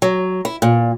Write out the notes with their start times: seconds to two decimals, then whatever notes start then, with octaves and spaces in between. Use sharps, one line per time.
0.02 F#3
0.45 E4
0.62 A#2